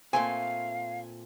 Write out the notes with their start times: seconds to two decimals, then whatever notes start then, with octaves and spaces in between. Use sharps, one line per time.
0.13 A#2 A3 C4 F5 G#5